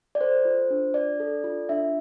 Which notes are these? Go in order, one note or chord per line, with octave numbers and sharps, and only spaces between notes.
D5
A4 C5
F4
D4
D4 D5
A4
F4
D4 E5